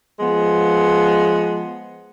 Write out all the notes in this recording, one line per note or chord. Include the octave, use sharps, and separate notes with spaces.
F3 G#3 B3